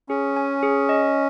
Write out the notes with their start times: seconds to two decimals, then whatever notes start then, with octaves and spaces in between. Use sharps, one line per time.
0.09 C#4 G#4
0.36 G#5
0.63 G#4
0.89 D#5